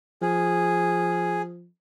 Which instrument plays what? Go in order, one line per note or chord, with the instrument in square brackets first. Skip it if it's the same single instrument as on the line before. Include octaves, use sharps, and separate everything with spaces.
[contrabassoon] F3 [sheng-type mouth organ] G#4